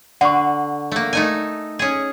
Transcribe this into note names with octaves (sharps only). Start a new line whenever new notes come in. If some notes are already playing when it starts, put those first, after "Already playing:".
D3 F#5 C#6
A3 A#3
A3 D#4 G#5
C#4 G#4